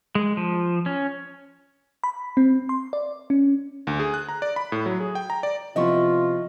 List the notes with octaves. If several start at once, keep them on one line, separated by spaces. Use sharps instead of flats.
G#3
F3
C#4
B5
C4
C6
D5
C#4
D2
G#4
F#6
A#5
D5
B5
A2
F#3
G#4
G5
A#5
D5
C3 F3 B3 E4 F4 D#5 C#6